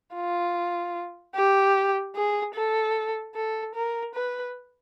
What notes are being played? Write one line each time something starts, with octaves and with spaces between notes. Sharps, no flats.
F4
G4
G#4
A4
A4
A#4
B4